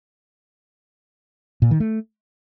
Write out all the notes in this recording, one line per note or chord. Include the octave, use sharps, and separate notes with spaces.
A#2
D#3
A3